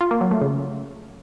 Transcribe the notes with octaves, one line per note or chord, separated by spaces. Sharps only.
F4
A#3
F#3
A3
C#3